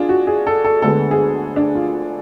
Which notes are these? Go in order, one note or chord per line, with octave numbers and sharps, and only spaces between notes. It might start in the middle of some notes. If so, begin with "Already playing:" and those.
Already playing: D4 F4 G#4
F#4
G#4
A4
A4
D2 D3 G#3 B3 A4
G#4
D4
F4